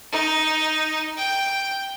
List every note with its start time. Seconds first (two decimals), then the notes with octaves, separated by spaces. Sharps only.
0.12 D#4
1.17 G5